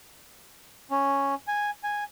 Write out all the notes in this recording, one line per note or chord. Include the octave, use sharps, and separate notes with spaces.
C#4
G#5
G#5